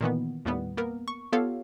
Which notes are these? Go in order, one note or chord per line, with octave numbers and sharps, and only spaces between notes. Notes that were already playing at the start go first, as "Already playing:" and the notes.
A#2 D#3 E3 B3
D#2 A2 G3 B3
A#3 B3 A#4
C#6
B3 F4 G4 A4 C#5 F5